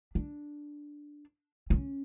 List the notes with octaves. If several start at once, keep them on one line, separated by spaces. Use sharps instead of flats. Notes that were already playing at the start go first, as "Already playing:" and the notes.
D4
C#4